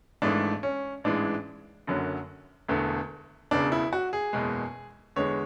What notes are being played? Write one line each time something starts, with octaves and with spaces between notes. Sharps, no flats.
G#1 G#2 E3 A3 D4
C#4
A1 G#2 E3 G#3 D4
F#1 F#2 D3 F#3
E1 E2 D3 A3
E1 E2 C#3 D4
E4
F#4
G#4
F#1 E2 B2 G#3
E2 D3 G#3 C#5